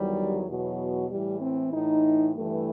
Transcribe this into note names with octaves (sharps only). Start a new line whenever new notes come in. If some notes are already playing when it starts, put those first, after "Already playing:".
Already playing: E2 D#3 F#3 G3
E2 B2 F#3
A2 E3 G3
C4
A2 E3 D#4
G2 E3 A3